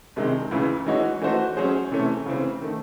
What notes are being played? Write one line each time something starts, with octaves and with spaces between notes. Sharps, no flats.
C2 C3 D#3 G#3
C#2 C#3 E3
E3 G#3 D#4 F#4 C#5
E3 A3 D#4 F#4 C5
F#3 C#4 G#4 C5
C3 E3 A3 C#4
C#3 E3 C4
D#3 A3